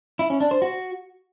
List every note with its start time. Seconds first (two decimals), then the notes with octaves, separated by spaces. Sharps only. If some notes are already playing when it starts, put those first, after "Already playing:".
0.19 E4
0.30 C#4
0.41 D4
0.51 C5
0.62 F#4